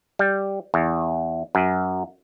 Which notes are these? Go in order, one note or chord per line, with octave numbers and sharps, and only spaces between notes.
G3
E2
F#2